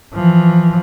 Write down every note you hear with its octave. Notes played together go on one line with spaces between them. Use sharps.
E3 F3